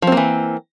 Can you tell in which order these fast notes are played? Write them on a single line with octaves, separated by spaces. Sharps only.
F3 C4 A#3 E3